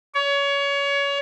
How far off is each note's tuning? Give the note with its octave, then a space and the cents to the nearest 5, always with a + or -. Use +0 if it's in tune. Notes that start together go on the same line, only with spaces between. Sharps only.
C#5 +25